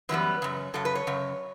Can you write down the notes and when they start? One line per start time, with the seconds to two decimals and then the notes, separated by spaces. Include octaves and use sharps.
0.09 F#2 E3 G3 B3 B4
0.42 F#2 C#3
0.74 F#2 C#3 A4
0.85 B4
0.95 C#5
1.07 F#2 C#3